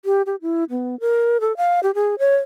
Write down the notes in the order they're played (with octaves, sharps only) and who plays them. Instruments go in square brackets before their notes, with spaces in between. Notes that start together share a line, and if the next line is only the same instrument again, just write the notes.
[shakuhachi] G4
G4
E4
B3
A#4
A4
F5
G4
G#4
C#5